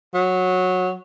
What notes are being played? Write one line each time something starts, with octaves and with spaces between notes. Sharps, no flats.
F#3